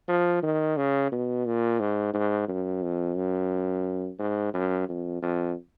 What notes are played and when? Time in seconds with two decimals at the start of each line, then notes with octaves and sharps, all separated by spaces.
0.08 F3
0.43 D#3
0.77 C#3
1.12 B2
1.46 A#2
1.79 G#2
2.14 G#2
2.48 F#2
2.82 F2
3.16 F#2
4.19 G#2
4.54 F#2
4.89 F2
5.22 F2